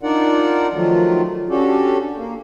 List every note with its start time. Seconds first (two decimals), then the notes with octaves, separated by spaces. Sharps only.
0.03 D4 D#4 F4 A#4 D5 F#5
0.73 D#3 F3 F#3 A3 F4
1.50 C#4 D4 F#4 G4 A4
2.17 A#3